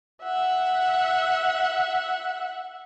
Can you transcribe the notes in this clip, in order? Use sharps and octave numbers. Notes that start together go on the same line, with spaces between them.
E5 F#5